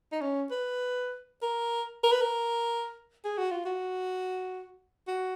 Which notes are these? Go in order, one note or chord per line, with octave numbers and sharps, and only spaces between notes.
D#4
C#4
B4
A#4
A#4
B4
A#4
G#4
F#4
F4
F#4
F#4